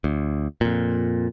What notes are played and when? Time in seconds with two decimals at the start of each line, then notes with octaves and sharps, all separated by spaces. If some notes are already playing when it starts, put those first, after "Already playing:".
0.04 D2
0.61 F2 A#2